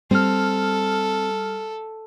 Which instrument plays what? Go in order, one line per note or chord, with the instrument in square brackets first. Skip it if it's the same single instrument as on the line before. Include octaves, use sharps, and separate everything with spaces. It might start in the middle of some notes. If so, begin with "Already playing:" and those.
[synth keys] G3 F6 [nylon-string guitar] C4 [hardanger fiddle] A4